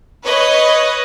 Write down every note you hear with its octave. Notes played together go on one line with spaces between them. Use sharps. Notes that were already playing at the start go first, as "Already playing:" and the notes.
B4 C#5 D#5